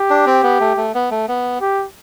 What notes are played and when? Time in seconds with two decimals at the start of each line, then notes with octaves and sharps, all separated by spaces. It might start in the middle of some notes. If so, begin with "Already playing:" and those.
Already playing: G4
0.10 D4
0.26 C4
0.43 B3
0.60 A3
0.77 A3
0.94 B3
1.11 A3
1.28 B3
1.61 G4